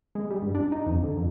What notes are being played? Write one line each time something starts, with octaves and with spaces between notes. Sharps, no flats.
G#3
G3
G2
D4
D#4
F2
D3
F2